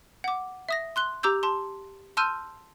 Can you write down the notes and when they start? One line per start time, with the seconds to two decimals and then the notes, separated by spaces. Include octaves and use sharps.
0.24 F#5 D6
0.69 E5 D#6 A#6
0.96 C6 F#6 G7
1.23 G4 A#5 D6 E6 G6
1.43 A5 C6
2.17 A5 C6 E6 F6 G6 D#7